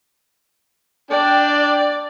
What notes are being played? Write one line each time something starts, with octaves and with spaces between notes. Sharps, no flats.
D4 D5 G5